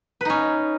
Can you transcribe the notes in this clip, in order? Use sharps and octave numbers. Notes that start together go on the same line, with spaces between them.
C#4 D#4 B4